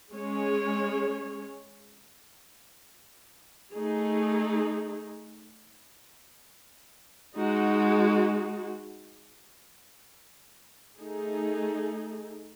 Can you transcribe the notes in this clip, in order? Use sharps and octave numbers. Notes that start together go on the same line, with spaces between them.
G#3 C#4 G#4 C#5
A3 D#4 G#4
G#3 D#4 F#4
A3 D#4 G#4